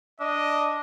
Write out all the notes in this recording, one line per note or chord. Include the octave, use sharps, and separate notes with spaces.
D4 D#5